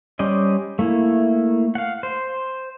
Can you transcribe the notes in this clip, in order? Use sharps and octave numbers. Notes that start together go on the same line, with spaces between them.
G3 C#4 C5 D5 D#5
A3 A#3 E4
F5 F#5
C5